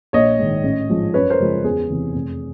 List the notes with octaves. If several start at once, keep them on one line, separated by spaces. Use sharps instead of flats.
A#1 C#5 D#5
G#2 D#3
A1
G#2 F3 G#3
F#2 B4 C#5
A#4 C5
C#3 F3 G#3
E2 G#4
C3 E3
F1